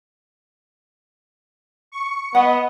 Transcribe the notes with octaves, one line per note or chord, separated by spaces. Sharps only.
C#6
B3 D#5 F#5